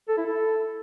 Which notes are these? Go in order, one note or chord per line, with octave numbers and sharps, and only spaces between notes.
A4
E4
A4